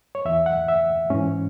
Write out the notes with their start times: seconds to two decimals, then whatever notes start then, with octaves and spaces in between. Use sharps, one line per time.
0.15 C#5
0.25 E2 E3 E5
0.46 F#5
0.68 E5
1.10 G#2 E3 C#4